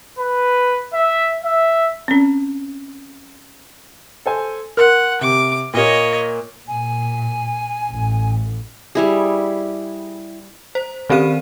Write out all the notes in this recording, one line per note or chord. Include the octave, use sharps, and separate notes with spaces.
B4
E5
E5
C4 C#4
A4 C5 G#5
A#4 F#5 C6 F6
C3 D6
A#2 A#3 C#5 D#5
A#2 G#5
A1
G3 E4 G#4
C5
D#3 C4 G4 F5 D#7